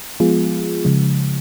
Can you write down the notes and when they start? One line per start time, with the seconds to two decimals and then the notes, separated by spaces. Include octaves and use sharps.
0.20 F3 G#3 B3 F4 G#4
0.85 C#3 F3 G#3